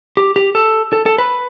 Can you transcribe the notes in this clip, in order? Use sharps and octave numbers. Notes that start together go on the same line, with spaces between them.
G4
G4
A4
A4
A4
B4